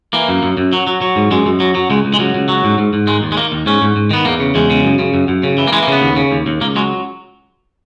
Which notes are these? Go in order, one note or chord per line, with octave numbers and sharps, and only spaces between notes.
E3 A#3
F#2
F#2
F#2
F#3
F#3
F#3
G#2
F#2 G#3
F#2
F#3
F#3
C#2 G#3
C#2
G#3
C#2 F#3
C#2
F#3
G#2
G#2
G#2
D#3 G#3
D#2
G#3
D#3 A#3
D#2
G#2 C#4
G#2
G#2
D#3 B3
E2 A#3
C#3
E2 G#3
C#3
F#2
C#3
F#2
F#2
C#3
E3
A#3
E3 G#3
A#3
C#3 B3
D#2
C#3
D#2
D#2
C#2 A#3
F#3 G#3